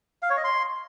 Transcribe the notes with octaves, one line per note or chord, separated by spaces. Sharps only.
F5
C#5
D#5
C6